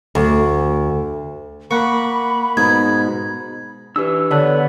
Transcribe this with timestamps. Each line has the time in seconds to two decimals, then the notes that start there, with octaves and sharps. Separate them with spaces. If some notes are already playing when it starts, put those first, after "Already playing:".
0.15 D2
1.71 A#3 F#5 B5 C#6
2.57 G#2 B2 D#4 G#6
3.96 E3 D4 G4 B4 E6
4.31 D3 B3 B4 C#5 D5 A5 F#6